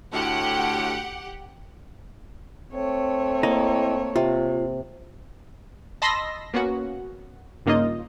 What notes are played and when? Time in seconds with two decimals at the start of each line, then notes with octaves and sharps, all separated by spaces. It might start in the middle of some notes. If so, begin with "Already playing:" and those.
0.13 D2 A2 G4 F#5
2.73 A3 C4 C#5
3.43 A#3 E4 D#5 A#5
4.16 C3 F4
6.02 D#5 A5 B5 C6 E6 A#6
6.53 A#3 B3 C#4 F#4
7.66 G2 C#3 A#3 D#4 F4 D#5